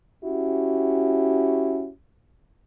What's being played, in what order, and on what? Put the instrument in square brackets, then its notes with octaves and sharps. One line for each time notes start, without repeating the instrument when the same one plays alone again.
[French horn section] C#4 E4 F#4 G4